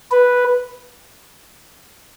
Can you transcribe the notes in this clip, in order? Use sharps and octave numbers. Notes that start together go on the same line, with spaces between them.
B4